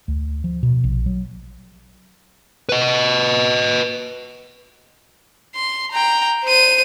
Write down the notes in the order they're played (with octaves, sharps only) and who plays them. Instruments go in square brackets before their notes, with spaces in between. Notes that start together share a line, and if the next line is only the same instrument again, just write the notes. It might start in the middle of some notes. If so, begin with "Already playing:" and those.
[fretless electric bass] D2
F3
B2
A#1
F#3
[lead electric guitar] B4 D#5
[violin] C6
G5 A#5
C5 D#7